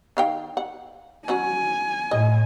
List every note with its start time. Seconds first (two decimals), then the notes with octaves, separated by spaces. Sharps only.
0.17 D#3 F5 G5
0.57 F#5
1.28 F#3 C#4 F#4 G#5
2.11 A2 D#5